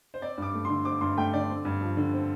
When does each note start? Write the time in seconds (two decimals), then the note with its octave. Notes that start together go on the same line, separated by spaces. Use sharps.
0.14 C5
0.21 C4 D5
0.38 G2 D6
0.54 A3
0.65 D3 C6
0.85 C4 D6
1.01 G2 C6
1.17 A3 G5
1.33 D3 D5
1.49 C4
1.65 G2
1.81 F3
1.97 D3
2.13 C4